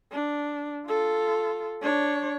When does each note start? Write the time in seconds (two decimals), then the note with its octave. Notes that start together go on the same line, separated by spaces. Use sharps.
0.13 D4
0.87 F4 A4
1.82 D4 C#5